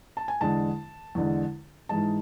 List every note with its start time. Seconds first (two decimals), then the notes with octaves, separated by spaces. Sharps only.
0.17 A5
0.28 G#5
0.41 E2 D3 G#3 A5
1.15 E2 D3 G#3
1.89 G#2 E3 G#3 A5